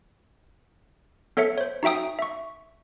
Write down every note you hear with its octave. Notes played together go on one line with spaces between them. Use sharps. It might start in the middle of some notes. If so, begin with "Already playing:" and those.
B3 A4 C#5 E5 C#7
C5 C#5
D#4 F#4 E5 G5 D#6
E5 C#6